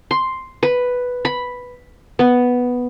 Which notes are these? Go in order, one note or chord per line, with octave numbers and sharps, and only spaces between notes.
C6
B4
B5
B3